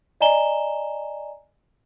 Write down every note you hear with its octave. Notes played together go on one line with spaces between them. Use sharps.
D5 D#5 G#5 A#5 E7 G7